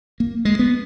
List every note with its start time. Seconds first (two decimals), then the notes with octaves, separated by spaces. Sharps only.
0.20 A#3
0.45 G#3
0.59 B3